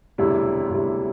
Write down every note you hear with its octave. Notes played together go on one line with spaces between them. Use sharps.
E1 D2 C3 G3 E4
E1 D2 C3 G3 E4